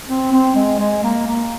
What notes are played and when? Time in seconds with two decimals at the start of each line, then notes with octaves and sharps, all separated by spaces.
0.09 C4
0.33 C4
0.55 G#3
0.79 G#3
1.03 A#3
1.27 A#3